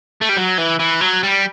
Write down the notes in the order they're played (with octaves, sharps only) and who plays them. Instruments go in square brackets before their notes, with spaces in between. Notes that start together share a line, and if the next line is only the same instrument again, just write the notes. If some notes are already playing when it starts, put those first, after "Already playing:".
[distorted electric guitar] A3
G3
F#3
E3
E3
F#3
G3